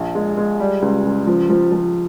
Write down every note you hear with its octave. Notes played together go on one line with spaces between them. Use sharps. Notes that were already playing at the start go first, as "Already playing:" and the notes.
Already playing: A#1
G#3
G#3
G3
C#2
C#2
F3
F3
F3